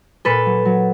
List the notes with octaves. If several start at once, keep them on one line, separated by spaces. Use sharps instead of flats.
A#2 A4 B4
F#3
F#3